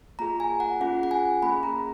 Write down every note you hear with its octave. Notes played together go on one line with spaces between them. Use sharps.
A#3 F4 G#4 A#5
G#5
F#5
C#4 F4 G#4 F#5
F#5
G#5
A#3 C#4 G#4 B5
A#5